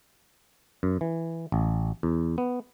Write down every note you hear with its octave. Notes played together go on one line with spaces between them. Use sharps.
F#2
E3
A1
E2
B3